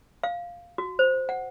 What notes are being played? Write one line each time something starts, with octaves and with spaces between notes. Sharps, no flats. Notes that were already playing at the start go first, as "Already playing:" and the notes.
F5
F#4
C5
F#5